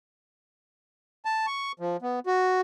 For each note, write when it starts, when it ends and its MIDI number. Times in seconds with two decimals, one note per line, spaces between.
1.25 1.46 81
1.47 1.72 85
1.80 1.97 53
2.02 2.20 59
2.27 2.61 66